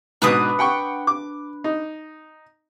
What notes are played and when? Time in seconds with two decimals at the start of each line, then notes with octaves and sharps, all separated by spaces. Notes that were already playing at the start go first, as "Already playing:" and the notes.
0.22 G#2 B2 D4 B4 D#6
0.59 F#5 G5 C#6
1.07 D6
1.64 D#4